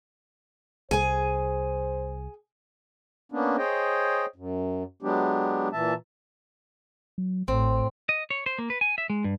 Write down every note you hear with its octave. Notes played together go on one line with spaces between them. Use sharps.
C2 G#4 C5 G#5
A#3 B3 C#4 D4
G#4 C5 C#5 D#5 G5
F#2
F#3 G#3 B3 D4 G4
A#2 E3 E5 A5
F#3
A1 A2 C4
D#5
C#5
C5
A#3
B4
G#5
E5
G#3
G2